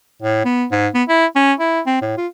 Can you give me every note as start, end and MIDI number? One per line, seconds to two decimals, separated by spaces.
0.22 0.41 45
0.45 0.66 59
0.71 0.88 44
0.94 1.03 59
1.09 1.26 64
1.36 1.53 61
1.60 1.81 64
1.86 1.98 60
2.02 2.17 45
2.17 2.27 65